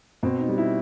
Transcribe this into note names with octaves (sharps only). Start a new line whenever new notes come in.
B2 C4
D#4
G3
E4